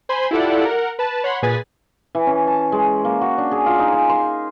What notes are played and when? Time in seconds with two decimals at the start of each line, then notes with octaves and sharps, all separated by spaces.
0.09 C5 G#5 B5 C6
0.31 E4 F4 G4 A4 D5 F#5
0.65 A#4 F#5
0.99 B4 A5
1.24 C#5 F#5 B5 C6
1.42 A#2 G#4 B4 G#5 A6 B6
2.15 E3
2.27 C#4
2.47 A5
2.72 G#3
3.05 A#3
3.21 F#4
3.38 D4
3.51 G#4
3.66 F4
3.79 D#4
3.92 G#5
4.09 C6